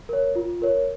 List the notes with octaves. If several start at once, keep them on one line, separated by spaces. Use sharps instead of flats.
A#4 C#5
F4
A#4 C#5